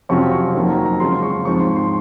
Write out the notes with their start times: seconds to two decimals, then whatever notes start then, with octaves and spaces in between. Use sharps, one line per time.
0.09 F2 C3 F#3 C#4 F4 C#6
0.31 C#6
0.55 F2 D#3 F#3 A#3
0.70 A#5
0.85 A#5
1.00 C#3 F3 G#3 C#4 F4 C6
1.23 C#6
1.45 G#2 F3 C4 C#6
1.60 C6
1.76 C6